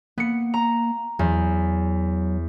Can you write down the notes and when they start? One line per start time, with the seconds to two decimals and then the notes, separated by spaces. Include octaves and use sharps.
0.18 A#3 B3 C#7
0.54 A#5
1.19 E2 F#3